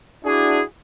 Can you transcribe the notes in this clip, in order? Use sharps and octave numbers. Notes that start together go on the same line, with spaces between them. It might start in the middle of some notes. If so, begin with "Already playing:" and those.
D4 E4 F#4 G#4